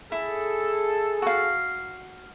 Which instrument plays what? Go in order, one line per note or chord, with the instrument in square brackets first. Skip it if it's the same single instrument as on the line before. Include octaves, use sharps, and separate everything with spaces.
[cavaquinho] E4 [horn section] G#4 A4
[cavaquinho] F#4 F5